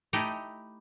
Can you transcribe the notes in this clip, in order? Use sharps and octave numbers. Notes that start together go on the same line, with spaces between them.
A3 D#4 E4 G4